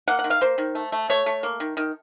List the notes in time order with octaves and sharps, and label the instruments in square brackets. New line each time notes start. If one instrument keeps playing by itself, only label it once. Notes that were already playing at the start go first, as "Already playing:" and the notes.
[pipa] A#3 F#5
F#5
D#3
F5
A#3 C5
D#3
A3
A3
A3 C#5
A3
A#3
D#3
D#3